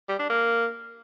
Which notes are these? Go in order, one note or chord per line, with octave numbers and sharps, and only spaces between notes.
G3
D4
A#3